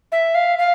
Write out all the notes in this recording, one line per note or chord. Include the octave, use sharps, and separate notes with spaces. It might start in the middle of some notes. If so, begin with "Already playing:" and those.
E5
F5
F5